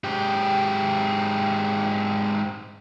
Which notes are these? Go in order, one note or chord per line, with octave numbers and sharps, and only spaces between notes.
G#2 G4